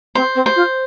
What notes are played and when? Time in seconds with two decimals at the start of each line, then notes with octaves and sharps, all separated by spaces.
0.15 C4 C5
0.35 C4
0.46 C5
0.56 F4